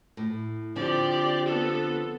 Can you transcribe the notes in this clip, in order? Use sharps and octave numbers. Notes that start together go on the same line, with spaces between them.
A2
D3 F3 C4 G4 D5
B3 A4